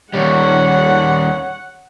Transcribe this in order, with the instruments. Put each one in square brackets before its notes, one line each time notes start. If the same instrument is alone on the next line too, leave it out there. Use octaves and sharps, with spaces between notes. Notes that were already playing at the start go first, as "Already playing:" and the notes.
[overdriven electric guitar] D#2 G3 [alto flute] C#5 [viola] F#5